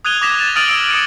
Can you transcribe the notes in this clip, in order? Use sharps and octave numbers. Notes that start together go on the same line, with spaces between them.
D#6 F#6 G#6 D#7 F7 G7
D6 D#6 G#6 A#6 B6 E7
A6
D#6 F6 A6 D7 D#7 F#7
E6 D7
D#6 C#7 D7